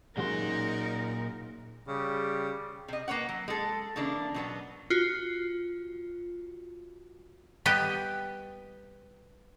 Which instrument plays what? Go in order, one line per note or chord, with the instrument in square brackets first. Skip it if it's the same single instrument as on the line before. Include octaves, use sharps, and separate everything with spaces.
[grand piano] F#2 F#4 G#4 [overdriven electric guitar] A#2 C6 [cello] D#4 A#4
[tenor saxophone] C#3 [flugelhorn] G3
[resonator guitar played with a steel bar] C3 D#5
A#3 B4 C#5 F#5
F#3
G#3 A4
C#3 E3 A#3 D4
B2 F#3 B3
[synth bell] F4 F#4
[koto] G3 B3 G4 D#5